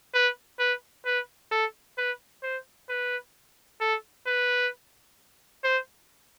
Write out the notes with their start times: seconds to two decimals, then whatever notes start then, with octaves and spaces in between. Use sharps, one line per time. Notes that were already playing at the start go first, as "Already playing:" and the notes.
0.14 B4
0.59 B4
1.05 B4
1.51 A4
1.98 B4
2.43 C5
2.89 B4
3.81 A4
4.26 B4
5.64 C5